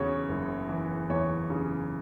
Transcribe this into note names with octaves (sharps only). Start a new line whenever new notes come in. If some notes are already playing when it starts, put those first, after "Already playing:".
Already playing: E2 C#3 F#4 C#5
F#1
E3
E2 C#5
C#3